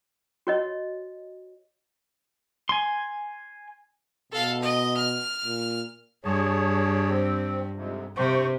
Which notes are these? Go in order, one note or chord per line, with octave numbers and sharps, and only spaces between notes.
F#4 C#5 D#5
G#5 C6
B2 A4 F5
D#5
F6
A#2
G2 G#4 C#5 A5
C4
F2 G#2 C3
G2 C3 C5 C#6